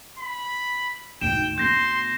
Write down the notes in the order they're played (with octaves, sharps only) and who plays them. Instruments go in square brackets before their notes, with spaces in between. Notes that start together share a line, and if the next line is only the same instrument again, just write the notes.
[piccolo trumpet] B5
[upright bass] D2 G#2 [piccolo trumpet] G5 [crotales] E7
[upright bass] D2 B3 [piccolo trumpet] C6 [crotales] G6 A#6